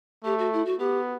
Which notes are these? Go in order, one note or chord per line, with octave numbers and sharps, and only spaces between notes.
A3 G4
F#4
E4
F#4
B3 G4